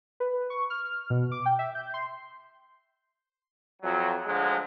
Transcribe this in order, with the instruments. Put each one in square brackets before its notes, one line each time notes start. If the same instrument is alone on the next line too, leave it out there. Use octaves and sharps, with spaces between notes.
[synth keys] B4
C#6
F6
B2
D6
G5
E5
G6
C6
[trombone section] F2 F#3
D2 D3 F3 F#3 G#3